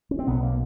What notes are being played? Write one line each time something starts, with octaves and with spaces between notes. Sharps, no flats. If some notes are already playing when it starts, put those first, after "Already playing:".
C#4
C4
B1 B2 B3
A#3